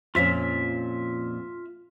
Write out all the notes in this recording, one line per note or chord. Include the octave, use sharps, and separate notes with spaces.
F2 A#2 C#4 F4 E5